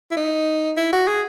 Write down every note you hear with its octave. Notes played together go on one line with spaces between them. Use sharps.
E4
D#4
E4
F#4
G#4